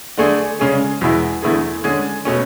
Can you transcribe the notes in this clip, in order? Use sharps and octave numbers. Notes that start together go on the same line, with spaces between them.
D3 A3 D4 G#4
C#3 G#3 C#4 G#4
E2 B2 G#3 B3 E4
E2 D3 A3 E4 G#4
D3 G#3 C#4 G#4
B2 A3 C#4